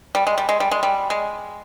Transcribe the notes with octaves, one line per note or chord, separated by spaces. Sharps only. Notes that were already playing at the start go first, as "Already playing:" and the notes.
G3
G#3
G3
G#3
G3
G#3
G3
G#3